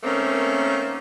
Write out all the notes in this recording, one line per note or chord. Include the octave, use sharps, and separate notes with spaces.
D#3 A3 A#3 C4 C#4